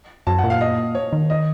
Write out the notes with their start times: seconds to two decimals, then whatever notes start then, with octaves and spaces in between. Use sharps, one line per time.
0.27 F#2 A5
0.38 F#5
0.44 A#2
0.50 F5
0.61 D#5
0.95 C#5
1.13 D#3
1.30 D#5